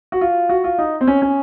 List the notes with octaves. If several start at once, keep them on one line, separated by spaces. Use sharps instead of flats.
F#4
F4
F#4
F4
D#4
C4
C#4
C#4